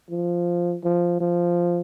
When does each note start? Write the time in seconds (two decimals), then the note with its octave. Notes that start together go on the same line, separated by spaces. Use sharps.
0.11 F3
0.84 F3
1.21 F3